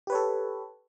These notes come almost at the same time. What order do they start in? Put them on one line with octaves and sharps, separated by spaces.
G4 B4 C#5 A4